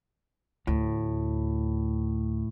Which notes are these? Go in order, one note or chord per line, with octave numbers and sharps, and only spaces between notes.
D2 A2